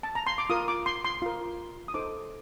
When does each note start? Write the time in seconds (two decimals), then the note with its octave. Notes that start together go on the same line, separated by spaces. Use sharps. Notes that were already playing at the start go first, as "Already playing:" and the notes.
0.03 A5
0.15 A#5
0.27 C6
0.38 D6
0.50 F4 A#4 D#6
0.68 D6
0.86 C6
1.05 C6
1.22 F4 A#4
1.88 D#6
1.94 D#4 A4 C5 D6